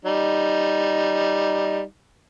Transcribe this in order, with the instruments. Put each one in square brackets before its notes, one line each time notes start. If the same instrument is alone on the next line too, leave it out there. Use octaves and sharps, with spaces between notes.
[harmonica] G3 D#4